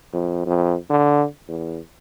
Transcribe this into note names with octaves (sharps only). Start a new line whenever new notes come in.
F2
F2
D3
E2